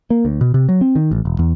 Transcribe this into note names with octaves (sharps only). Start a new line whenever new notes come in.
A#3
D2
B2
C3
F#3
C4
D#3
A1
E1
E2